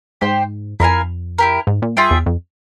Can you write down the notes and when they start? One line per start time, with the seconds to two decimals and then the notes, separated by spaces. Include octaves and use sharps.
0.21 G#2 G4 C5 G5
0.80 F2 E4 A#4 F5 G#5
1.38 E4 G4 A#4
1.67 G#2
1.82 A#2
1.96 G2 F4 G#4 E5 G5
2.11 E2
2.26 F2